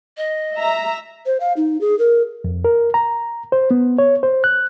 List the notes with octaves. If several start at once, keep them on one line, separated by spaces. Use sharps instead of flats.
D#5
E5 A#5
C5
F5
D#4
G#4
A#4
F2
A#4
A#5
C5
B3
C#5
C5
F#6